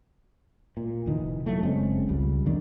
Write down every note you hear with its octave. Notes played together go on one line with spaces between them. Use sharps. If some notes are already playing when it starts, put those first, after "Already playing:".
A#2
F1 D#3 E3
F#3 A3
F#1 G#3 C4 C#4
C#2 G3
F2 D#3 D4